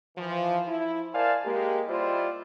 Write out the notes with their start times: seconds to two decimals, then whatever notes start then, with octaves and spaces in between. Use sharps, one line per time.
0.16 E3 F3
0.67 E4
1.13 A#4 C5 D5 F5 G#5 A5
1.44 G#3 A#3 G4
1.88 G3 E4 F4 C5 D5 D#5